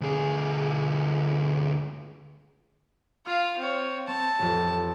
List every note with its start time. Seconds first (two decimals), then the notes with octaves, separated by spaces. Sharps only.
0.01 D2 G#4
3.26 F4 F5 F6
3.58 C4 C#5
4.08 C4 A5
4.39 A1 F2